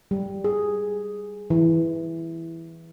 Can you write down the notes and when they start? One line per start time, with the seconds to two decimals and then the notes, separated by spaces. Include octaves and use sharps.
0.11 G3
0.44 G#4
1.50 E3